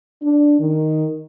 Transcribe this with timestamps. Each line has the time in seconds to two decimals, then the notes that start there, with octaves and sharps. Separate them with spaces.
0.22 D4
0.60 D#3